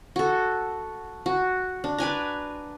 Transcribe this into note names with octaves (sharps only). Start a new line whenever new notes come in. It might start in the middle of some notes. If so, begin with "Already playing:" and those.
F#4 A4
F#4
D4
B4 D5 G#5 A#5